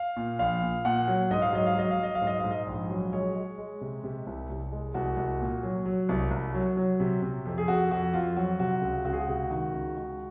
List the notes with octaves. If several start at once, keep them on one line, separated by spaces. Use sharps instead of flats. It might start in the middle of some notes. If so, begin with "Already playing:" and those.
Already playing: F5
A#2
A#1 F5
A#2
A#2 F#5
F#3
G#2 D#5
F5
F#3 D#5
F5
F#3 D#5
F5
F#3
D#5
F5
G#2
D#5
G#2 F5
D#5
A#1
F#3
G#3 C#5
G#3
G#3
C3
C3
C2
C2
G#3
C2 F#4
C2
A#2
F#3
F#3
C2
C2
F#3
F#3
C3
C3
F2
G#4
F2 F#4
F2 F#4
F2 F4
F#3 F#4
C3 F#4
C#2
C#2 F#4
G#4
F#4
C3
D#3 F#4
C#2
G#3